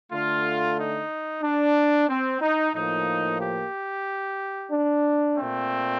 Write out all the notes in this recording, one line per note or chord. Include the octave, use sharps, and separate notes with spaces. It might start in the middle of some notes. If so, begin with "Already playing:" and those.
D3 A3 F4
D#4
D4
C4
D#4
A2 F3 A#3 D#4
G4
D4
A#2 A3 C4